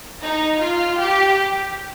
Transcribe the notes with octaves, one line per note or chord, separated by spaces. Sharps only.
D#4
F4
G4